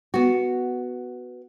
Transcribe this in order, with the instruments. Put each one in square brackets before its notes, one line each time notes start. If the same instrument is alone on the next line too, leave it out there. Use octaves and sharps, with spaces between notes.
[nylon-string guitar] B3 F#4